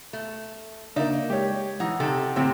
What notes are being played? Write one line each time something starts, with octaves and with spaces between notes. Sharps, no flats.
A3
C#3 A#3 D4 D#4 D5 E5
G#3 G4 C#5
E3 D#4 F#5
C3 D#4 A4
A2 C3 C4